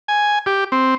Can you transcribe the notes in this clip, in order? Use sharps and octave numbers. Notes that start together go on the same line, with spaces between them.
G#5
G4
C4